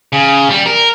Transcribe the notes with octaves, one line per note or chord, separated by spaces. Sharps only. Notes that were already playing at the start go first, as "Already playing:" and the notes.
C#3
G3
A#4